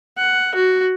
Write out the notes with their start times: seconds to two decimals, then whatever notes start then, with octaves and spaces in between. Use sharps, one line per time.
0.17 F#5
0.55 F#4